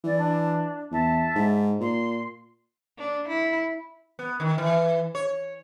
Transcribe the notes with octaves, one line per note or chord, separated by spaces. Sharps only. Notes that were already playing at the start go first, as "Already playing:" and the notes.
E3 D5
D4
E2 E5 A5
G#2
A#2 C6
D4
E4
B3
D#3
E3
C#5